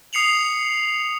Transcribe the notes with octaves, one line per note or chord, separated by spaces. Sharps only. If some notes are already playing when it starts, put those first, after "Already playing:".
D#6 C7 C#7 F7 F#7